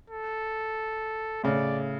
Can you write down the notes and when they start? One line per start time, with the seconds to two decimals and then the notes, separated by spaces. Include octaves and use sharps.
0.10 A4
1.44 A2 C#3 D5